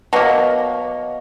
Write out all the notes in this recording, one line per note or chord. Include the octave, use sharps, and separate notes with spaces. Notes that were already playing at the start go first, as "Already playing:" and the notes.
B2 F#3 A#3